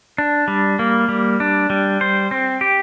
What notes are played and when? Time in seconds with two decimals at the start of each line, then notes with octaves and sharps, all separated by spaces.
0.18 D4
0.48 G3
0.79 A#3
1.09 G3
1.40 D4
1.70 G3
2.01 C5
2.31 C4
2.61 G4